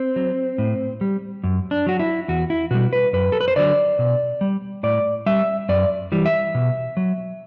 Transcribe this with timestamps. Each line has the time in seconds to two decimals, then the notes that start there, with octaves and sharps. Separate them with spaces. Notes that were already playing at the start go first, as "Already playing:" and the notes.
Already playing: C4
0.16 F#3
0.58 A2
1.01 G3
1.44 F#2
1.71 D4
1.86 F#3 F#4
1.99 E4
2.28 E2 F#4
2.50 E4
2.71 B2 G3 F#4
2.93 B4
3.13 F#2 B4
3.32 A4
3.41 B4
3.48 C5
3.56 D3 F#3 D5
3.99 B2
4.41 G3
4.83 A2 D5
5.26 G3 E5
5.69 F#2 D5
6.12 E3 G3
6.26 E5
6.55 B2
6.97 F#3